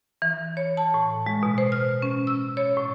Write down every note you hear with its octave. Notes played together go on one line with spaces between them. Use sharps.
E3
C#5
A5
A2
G#3
B2
C5
F6
C#4
E6
C#5
A2